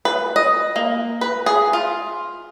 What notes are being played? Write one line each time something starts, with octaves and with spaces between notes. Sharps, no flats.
B4
D#5
A#3
B4
G#4
F4